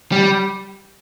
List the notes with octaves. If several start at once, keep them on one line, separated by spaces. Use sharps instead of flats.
G3